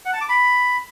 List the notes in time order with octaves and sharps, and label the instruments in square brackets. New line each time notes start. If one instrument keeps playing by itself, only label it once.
[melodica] F#5
A5
D6
B5